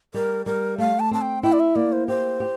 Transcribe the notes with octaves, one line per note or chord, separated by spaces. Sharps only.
G3 A#4
G3 A#4
A3 F5
A5
C4 A5
G5
E4 G5
D5
E5
A#3 D5
C5
G4 C5
G4